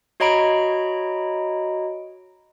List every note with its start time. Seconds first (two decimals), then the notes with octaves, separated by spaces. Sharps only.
0.20 F#4 C#5 D#5 A#5 B5 D7